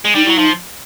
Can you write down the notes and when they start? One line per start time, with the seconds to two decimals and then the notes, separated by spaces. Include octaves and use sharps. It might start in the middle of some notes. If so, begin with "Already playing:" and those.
0.05 G#3
0.15 G3 D#4
0.25 F#3 E4
0.36 F3 D#4